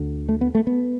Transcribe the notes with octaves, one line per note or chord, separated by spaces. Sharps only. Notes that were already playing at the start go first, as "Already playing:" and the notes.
Already playing: D2 D3
A3
B3
A3
B3